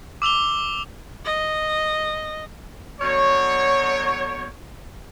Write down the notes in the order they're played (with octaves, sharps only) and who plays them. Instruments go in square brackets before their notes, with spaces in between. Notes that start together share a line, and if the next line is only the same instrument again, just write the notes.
[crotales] D6 E6 F7 G7
[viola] D#5
[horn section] B2 D3 F#3 C#5